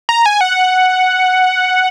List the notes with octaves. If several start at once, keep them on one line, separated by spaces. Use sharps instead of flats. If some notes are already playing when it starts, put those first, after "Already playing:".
A#5
G#5
F#5